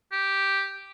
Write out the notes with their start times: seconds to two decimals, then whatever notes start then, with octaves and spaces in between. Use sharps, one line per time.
0.12 G4